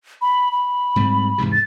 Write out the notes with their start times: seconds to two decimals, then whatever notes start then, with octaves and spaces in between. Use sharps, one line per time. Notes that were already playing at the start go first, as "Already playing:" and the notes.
0.22 B5
0.52 B5
0.96 G#2 G3 C4
1.38 E2 G#2 C3
1.52 A6